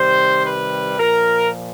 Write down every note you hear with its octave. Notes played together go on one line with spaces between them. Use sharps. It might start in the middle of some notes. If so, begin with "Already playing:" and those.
Already playing: C3 D#3 G3 C5
B4
A#2 F3 A#4